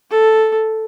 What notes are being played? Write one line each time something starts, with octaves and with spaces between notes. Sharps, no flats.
A4